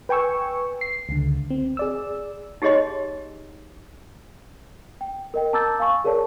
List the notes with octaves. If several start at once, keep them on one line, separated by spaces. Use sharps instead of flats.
B4 G5 G#5 C#6 E6
C7
C#2 D3
C4
G#4 D5 E6
D#4 G4 G#4 C#5 D#5 C6
G5
A#4 D#5 G5
A5 A#5 D6 E6 G6 A6
F5 G#5 C#6
G#4 A#4 C#5 D5 A5